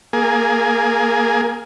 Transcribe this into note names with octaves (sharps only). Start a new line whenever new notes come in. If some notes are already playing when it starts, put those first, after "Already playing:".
A#3 G#4